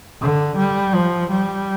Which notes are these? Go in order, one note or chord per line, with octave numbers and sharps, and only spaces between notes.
D3
G3
F3
G3